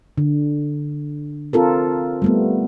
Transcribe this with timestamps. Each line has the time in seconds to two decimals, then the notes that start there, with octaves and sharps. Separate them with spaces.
0.18 D3
1.53 C4 F4 A4 A#4
2.22 G3 A3 B3